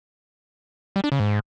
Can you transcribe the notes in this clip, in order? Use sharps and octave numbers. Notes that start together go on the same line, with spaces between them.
G3
D4
C#3
G#2